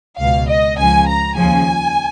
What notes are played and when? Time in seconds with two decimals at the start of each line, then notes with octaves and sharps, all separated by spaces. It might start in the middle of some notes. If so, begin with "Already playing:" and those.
0.18 C#2 B2 F5
0.47 D#5
0.77 C#2 C#3 F3 G#5
1.06 A#5
1.36 D#2 C#3 F3 G#5